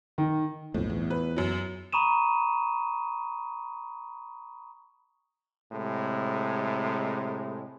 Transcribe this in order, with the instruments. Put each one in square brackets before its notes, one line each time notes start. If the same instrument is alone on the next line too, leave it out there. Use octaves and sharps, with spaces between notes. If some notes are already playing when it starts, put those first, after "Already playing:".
[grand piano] D#3
[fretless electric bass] B1 F2 [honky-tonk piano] A2
[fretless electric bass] E2
[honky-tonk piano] B4
F#2 F#3
[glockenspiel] A#5 B5 C#6 D#6 D#7 E7
[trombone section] A2 C3 G#3